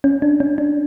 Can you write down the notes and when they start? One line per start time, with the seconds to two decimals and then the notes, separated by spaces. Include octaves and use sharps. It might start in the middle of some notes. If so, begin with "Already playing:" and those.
0.04 C#4
0.22 D4
0.40 C#4
0.58 D4